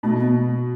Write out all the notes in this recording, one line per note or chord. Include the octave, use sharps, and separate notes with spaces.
B2 A3
B3